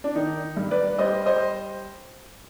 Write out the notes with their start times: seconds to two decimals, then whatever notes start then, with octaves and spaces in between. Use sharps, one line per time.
0.04 D4
0.15 D#3 D#4
0.57 G2
0.71 B4 D5
0.98 G3 C5 D#5
1.26 C5 D#5